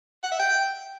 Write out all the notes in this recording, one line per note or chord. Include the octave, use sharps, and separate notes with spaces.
F#5
E5
G5